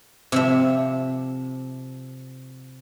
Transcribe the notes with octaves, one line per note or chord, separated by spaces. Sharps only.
C3 F3 E5